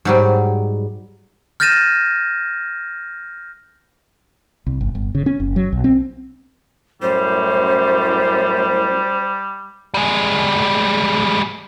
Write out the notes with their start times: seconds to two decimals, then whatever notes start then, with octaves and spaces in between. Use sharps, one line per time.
0.05 G#2 F#3 G3
1.60 F6 G6 A6 A#6 D#7 E7
4.67 C2
4.81 G1
4.95 G1
5.15 C#3
5.26 C#4
5.40 F#1
5.56 F#3
5.73 B1
5.84 C4
7.02 F#2 A2 G3 C5
9.94 G3 G#3